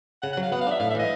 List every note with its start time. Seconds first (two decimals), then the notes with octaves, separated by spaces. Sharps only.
0.23 C#3 F#5
0.33 F#5
0.37 F#3
0.43 F5
0.52 B3 F#5
0.61 F5
0.67 D4 E5
0.80 A2 F5
0.91 E5
0.95 E3 D#5